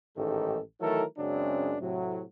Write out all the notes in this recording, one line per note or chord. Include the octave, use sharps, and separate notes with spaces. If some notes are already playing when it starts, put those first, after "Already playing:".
A1 G#2 D#3 G#3 G4 A4
D#3 E3 F#3 A3 A4 A#4
F#2 C#3 F#3 G#3 C4 D4
A2 C3 F#3